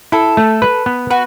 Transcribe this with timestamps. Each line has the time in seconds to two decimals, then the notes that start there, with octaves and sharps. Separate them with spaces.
0.12 E4 A4
0.37 A3
0.62 B4
0.86 B3
1.10 F#4 B4